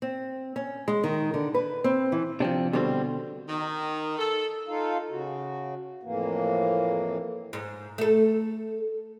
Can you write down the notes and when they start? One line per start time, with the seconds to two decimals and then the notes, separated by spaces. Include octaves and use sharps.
0.02 C4
0.56 C#4
0.88 G#3
1.04 D#3
1.34 D3
1.54 B4
1.84 C4
2.12 E3
2.40 C3 F3 C4 D4
2.73 B2 D3 G3 C4
3.47 D#3
4.19 A4
4.68 D#4 F4 A4 F5
5.10 C#3 F#4
6.03 F2 A2 E3 A#3
7.53 G#2
7.98 A3 A4